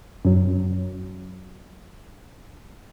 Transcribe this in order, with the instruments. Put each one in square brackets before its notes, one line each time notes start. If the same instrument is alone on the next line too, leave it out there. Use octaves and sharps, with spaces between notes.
[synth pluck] F#2 F#3